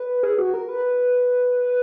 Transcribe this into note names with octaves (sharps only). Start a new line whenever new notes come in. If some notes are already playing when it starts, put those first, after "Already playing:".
Already playing: B4
G#4
F#4
A#4
B4